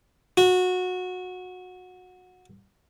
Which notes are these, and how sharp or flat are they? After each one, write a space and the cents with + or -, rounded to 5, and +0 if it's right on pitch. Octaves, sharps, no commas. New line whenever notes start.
F#4 -20